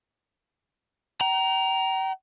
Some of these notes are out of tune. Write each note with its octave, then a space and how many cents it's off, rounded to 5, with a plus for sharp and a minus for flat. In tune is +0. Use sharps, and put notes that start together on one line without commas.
G5 -40 A#5 +10